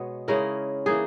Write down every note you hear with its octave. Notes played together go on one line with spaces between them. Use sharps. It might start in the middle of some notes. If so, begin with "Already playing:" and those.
Already playing: B2 G#3 B3 C#5
C#3 G#3 C#4 E4 A#4
E3 A#3 D#4 G#4